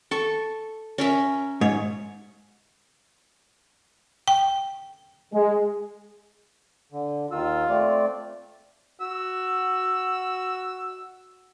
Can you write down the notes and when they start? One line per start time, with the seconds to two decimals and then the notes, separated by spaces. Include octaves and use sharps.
0.11 A4 C#6
0.98 C#4 A#4 E5
1.61 G#2 C#5
4.28 G5
5.34 G#3
6.92 D3
7.32 D#2 D#3 F4 E6
7.70 A3 C4 D5
9.01 F#4 E6